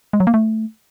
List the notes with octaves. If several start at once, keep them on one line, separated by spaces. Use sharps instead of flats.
G#3
F#3
A#3
A3